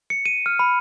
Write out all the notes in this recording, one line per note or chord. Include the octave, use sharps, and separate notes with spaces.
C#7
D#7
F6
B5